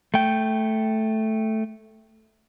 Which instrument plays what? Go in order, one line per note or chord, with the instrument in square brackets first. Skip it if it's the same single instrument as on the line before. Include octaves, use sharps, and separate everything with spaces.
[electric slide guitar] A3 G5